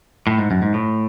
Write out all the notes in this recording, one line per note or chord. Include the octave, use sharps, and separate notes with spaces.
A2
G#2
F#2
G#2
A2